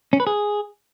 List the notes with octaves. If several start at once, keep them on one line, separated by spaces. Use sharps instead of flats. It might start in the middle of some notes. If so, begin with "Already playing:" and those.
C#4
B4
G#4